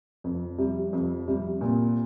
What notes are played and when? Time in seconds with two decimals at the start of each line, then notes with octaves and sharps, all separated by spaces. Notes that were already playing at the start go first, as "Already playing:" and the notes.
0.24 F2
0.58 C3 G3
0.93 F2
1.28 C3 G3
1.61 A#2